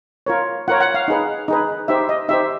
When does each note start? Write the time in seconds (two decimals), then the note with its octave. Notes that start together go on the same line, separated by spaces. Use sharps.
0.26 F4 A#4 C#5
0.68 F4 A#4 C#5 F#5
0.80 F#5
0.94 F5
1.08 D#4 G#4 B4
1.48 D#4 G#4 B4
1.88 D#4 G4 C5 E5
2.09 D#5
2.28 D#4 G4 C5 E5